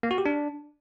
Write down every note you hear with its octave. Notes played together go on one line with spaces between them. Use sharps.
A#3
F#4
G4
D4